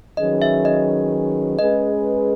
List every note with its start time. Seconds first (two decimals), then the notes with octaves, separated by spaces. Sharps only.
0.17 D#3 F#3 C#4 G#4 B4 D#5
0.42 E5
0.65 D#5
1.59 G#3 C#4 G#4 B4 D#5